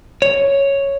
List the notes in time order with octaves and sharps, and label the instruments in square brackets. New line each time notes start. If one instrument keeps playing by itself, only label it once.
[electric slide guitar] C#5